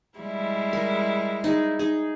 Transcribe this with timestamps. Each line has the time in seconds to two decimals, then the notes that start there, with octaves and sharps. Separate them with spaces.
0.18 G3 G#3 E4
0.73 A#4
1.44 D#4 G#4
1.79 D#4 G#4